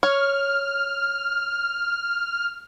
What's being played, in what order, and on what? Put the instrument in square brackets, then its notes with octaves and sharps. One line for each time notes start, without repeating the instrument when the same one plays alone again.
[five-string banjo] C#5 [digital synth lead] F6